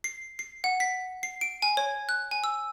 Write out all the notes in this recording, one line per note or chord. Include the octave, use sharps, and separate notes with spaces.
C7
C7
F#5
B6
C7
D7
G#5
C#5
F#6
G#5
E6